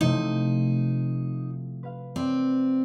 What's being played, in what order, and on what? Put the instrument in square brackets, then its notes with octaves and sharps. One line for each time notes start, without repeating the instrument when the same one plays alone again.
[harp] C3 F3 A3 [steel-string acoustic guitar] D#4
[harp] B4 F5
[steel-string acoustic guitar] C4 [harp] D5